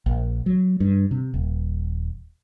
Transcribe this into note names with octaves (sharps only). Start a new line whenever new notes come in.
A#1
F#3
G2
C3
D#1